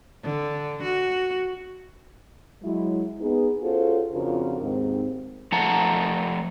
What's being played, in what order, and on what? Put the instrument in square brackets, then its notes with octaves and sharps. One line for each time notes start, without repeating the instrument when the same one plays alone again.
[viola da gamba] D3
F#4
[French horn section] F#3 G#3 E4
B3 D#4 G#4
C#4 F4 F#4 G#4 A4 C5
F2 C#3 D4 F4 F#4 A#4
D#2 G#2 C4
[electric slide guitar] F3 A3 F#5 A5 A#5